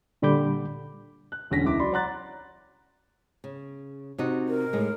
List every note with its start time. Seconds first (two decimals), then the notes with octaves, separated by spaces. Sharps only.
0.22 A#2 D3 G3 B5 D6 G6
1.32 F#6
1.51 E1 D3 C#4 A#6 B6
1.65 C#2 E4 D6
1.79 F#3 D5 B5 C6
1.92 C#5 F#5 A#5 C6 F#6 A6
3.44 C#3
4.18 C3 D#4 F#4
4.48 A#4
4.73 A2 G#3 D#4